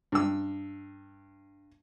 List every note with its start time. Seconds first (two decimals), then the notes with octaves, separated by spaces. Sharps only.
0.12 G2 E6